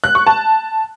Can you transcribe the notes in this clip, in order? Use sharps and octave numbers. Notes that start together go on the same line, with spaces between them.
F#6
C#6
A5